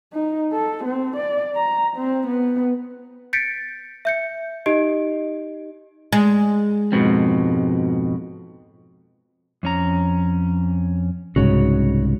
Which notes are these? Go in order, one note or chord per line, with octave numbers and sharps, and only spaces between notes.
D#4
A4
C4
D5
A#5
C4
B3
G6 A6 B6 C#7 D7
E5 G6 C#7
D#4 G4 D#5 D7
G#3
F2 G#2 B2
F2 C#4 A#5
C2 G#2 C#3 F#4 C#5